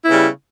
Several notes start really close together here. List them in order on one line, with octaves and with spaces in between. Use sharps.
E4 B3 C#3 G3